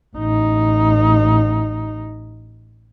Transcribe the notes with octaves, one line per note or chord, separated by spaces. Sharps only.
A1 D#4